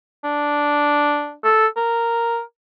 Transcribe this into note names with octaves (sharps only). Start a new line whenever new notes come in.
D4
A4
A#4